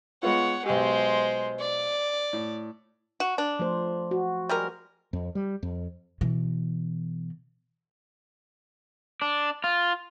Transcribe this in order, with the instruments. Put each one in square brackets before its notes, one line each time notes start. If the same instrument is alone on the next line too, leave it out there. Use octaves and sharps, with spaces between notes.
[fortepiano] G#3 B3 F4 [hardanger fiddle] C#5 F#5
[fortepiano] B1 G4 [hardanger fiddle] G#3 C5
[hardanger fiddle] D5
[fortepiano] A2
[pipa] F#4
D4
[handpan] F3 A3 C5
F#4
[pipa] G3 G#3 A#4
[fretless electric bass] F2
G3
F2
[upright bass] B2 E3
[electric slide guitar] D4
F4